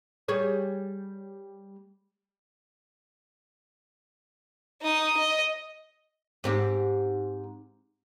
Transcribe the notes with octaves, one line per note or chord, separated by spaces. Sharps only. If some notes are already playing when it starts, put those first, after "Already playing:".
G3 G#4 C#5
D#4 D#6
D#5
G#2 C4 G4